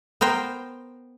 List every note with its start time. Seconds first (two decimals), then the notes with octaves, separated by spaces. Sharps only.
0.21 B3 A#4 C5 G5